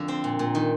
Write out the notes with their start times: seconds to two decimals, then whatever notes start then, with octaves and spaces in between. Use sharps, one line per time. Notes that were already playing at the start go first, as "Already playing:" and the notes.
Already playing: F2 D3
0.08 C4
0.24 A#2
0.39 A#2
0.55 D#3